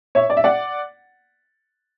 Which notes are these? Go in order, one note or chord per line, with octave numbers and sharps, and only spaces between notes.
C#5 E5
D5
E5
D5 F#5